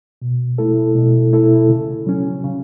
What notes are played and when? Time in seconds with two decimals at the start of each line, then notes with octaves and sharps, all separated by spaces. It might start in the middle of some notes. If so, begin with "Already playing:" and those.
0.22 B2
0.58 A3 E4 A4
0.95 B2
1.33 A3 E4 A4
1.70 C#3
2.07 F#3 C#4
2.44 C#3